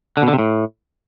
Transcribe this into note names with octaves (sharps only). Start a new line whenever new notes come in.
D3
B2
D3
C3
A2